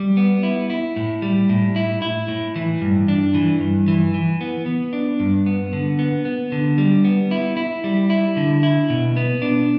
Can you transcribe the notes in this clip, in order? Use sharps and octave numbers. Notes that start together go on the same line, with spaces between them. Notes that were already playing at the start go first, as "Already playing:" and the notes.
Already playing: G3
B3
E4
E4
A2
G3
A2
E4
E4
A2
E3
G2
D4
E3
G2
E3
E3
B3
B3
D4
G2
B3
D3
B3
B3
D3
G3
B3
E4
E4
G3
E4
D3
E4
B2
B3
D4